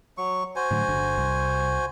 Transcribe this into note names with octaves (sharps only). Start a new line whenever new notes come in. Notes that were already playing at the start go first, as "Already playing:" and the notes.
F#3 C#6
F#4 C5 G#5
A2 D3 F#3
G1 D3
C2